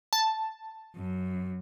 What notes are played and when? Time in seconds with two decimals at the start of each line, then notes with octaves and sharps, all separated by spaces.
0.13 A5
0.96 F#2